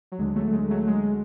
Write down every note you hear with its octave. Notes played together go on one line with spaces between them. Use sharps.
F#3
D2 D3 G#3
F#3 A3
A3
G#3
F#3 A3
G#3